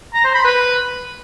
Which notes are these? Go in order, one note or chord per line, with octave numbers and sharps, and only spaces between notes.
A#5
C5
B5
B4